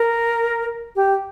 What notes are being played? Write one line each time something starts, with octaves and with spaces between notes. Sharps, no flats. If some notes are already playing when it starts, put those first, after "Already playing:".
Already playing: A#4
G4